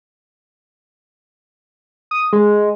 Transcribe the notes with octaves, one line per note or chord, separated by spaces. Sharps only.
D#6
G#3